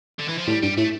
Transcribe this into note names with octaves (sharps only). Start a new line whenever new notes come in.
D3
E3
F3
A2 G3
G2 G3
A2 A3